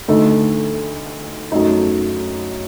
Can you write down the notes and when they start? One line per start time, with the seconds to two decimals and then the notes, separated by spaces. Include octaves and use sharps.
0.08 D2 D3 A3 D#4 A4
1.52 F#2 F#3 A3 D#4